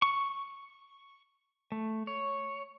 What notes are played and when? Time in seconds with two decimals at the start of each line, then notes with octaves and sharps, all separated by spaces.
0.02 C#6
1.72 A3
2.07 C#5